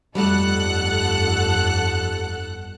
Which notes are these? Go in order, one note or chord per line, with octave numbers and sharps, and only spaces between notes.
G1 F2 G3 A3 D#4 A4 F#5 F#6